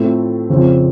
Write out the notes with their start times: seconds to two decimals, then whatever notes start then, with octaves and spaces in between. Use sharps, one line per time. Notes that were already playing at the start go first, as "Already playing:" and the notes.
Already playing: A2 A3 C4 F4 A4
0.49 F2 C#3 F3 C4